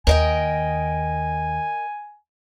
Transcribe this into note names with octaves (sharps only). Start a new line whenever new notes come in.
D#2 A#4 D#5 G5 G#5